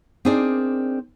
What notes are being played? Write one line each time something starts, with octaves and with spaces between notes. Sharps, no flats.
C4 D4 D#4 G#4 A#4 D5